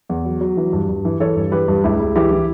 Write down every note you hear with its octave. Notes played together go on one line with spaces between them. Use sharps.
E2
F#3
F#3
E3
G2
G2
E3
E3 A4 C#5
G2
E3 G4 B4
G2
C#2 E4 G4
C#2
E3 E4 G4
E3